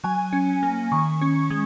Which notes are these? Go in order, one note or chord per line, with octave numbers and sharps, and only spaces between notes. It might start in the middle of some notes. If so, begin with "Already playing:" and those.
F#3 G#5
C#4
A#3
D#3 C#6
C#4
G#3